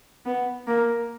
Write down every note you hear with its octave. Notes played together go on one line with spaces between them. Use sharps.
B3
A#3